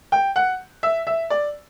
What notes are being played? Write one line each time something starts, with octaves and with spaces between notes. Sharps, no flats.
G5
F#5
E5
E5
D5